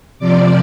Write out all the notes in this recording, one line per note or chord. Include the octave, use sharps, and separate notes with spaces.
C3 F3 D5 D6